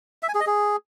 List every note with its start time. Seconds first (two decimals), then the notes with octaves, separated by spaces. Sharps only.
0.23 E5
0.29 G#5
0.35 G#4
0.41 D#5
0.47 G#4